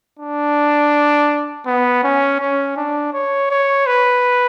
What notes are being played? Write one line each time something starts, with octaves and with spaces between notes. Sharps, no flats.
D4
B3
C#4
C#4
D4
C#5
C#5
B4